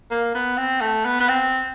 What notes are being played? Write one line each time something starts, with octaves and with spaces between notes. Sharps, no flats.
A#3
B3
C4
A3
B3
B3
C4